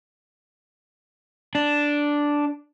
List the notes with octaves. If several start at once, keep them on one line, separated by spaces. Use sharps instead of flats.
D4